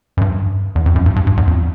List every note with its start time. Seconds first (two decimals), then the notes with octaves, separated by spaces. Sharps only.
0.17 F#2
0.21 G2
0.75 E2
0.86 F2
0.95 F#2
1.06 G2
1.16 G2
1.27 G2
1.37 E2
1.47 F2